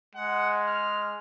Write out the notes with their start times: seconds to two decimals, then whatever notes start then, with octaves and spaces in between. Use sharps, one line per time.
0.15 G#3 F#5
0.66 F6